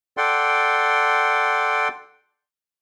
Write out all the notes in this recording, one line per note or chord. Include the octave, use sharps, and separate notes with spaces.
A4 D5 F#5 G5 C6